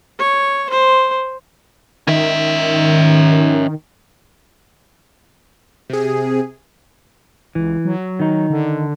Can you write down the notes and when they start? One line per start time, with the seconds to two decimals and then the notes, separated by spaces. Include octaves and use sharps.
0.19 C#5
0.70 C5
2.07 D#3 C#4 E5
5.90 C3 G#4
7.55 C#2 E3
7.85 F#3
8.19 D#3 D#4
8.50 D3